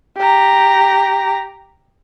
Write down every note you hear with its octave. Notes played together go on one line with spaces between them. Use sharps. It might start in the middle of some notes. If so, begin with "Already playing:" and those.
G4 A#5